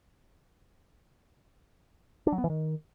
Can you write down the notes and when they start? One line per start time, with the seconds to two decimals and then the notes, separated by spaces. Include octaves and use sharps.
2.27 D4
2.32 F#3
2.38 B3
2.44 E3
2.50 D#3